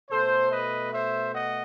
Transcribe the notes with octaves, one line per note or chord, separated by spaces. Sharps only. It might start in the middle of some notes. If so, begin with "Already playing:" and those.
B2 A3 A4 C5
B4 D#5
C5 E5
D#5 F#5